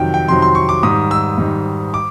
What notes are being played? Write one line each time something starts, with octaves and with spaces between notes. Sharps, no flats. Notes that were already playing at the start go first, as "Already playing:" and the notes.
Already playing: F2 C3 D#3 F#3 G5
G5
F2 C3 D#3 F#3 C6
C6
C#6
D6
G#2 D#3 G3 D#6
E6
G#2 D#3 G3
D6